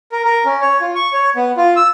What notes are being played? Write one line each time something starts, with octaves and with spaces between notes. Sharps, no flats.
A#4
A#4
C#4
C#5
F4
C#6
C#5
B3
F4
E6